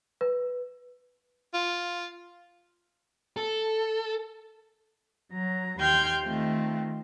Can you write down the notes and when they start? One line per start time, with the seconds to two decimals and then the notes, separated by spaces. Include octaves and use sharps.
0.21 B4
1.54 F4
3.37 A4
5.31 F#3 A#5
5.79 D#2 G5 C6 F6 G6 G#6
6.24 D#3 A3 C4 F4